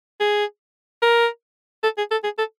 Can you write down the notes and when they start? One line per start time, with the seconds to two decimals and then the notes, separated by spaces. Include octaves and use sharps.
0.20 G#4
1.02 A#4
1.83 A4
1.98 G#4
2.11 A4
2.24 G#4
2.38 A4